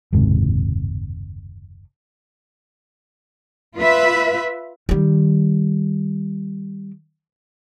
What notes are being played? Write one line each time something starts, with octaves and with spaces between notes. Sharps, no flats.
F#1 D#2 G#2 C3
F4 B4 E5
D#3 G3